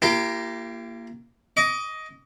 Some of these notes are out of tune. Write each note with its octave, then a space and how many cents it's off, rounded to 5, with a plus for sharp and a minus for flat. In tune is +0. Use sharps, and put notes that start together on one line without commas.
A#3 +0 E4 +45 G4 +0
D#5 +10 D6 -35